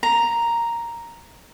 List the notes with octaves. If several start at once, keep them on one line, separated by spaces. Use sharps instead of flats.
A#5